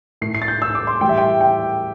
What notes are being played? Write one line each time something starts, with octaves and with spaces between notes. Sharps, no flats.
A2 A3 C7
C7
A6
G6
E6
D6
C6
A2 E3 G3 G5
E5
G5
G5